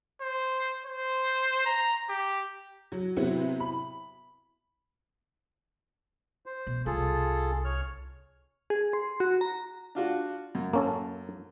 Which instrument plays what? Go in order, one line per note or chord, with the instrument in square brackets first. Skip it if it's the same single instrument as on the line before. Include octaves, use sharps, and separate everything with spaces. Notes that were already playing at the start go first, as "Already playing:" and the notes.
[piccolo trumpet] C5
C5
A#5
G4
[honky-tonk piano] F#3
C3 F#3 B3 C4 E4
B5
[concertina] C5
[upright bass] B2
[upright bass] C2 [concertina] F4 G#4 A4
[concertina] C#5 F6
[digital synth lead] G#4
C6
F#4
A#5
[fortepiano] D4 F4 F#4
F#2
[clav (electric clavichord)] A#3 C#4 A4